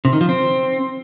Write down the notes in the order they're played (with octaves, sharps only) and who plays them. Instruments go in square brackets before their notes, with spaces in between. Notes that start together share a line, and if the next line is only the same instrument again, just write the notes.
[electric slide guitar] C3
D#3
F3
C4